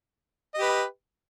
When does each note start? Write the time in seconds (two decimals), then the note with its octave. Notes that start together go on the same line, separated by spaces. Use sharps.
0.54 D#5
0.58 G4
0.62 B4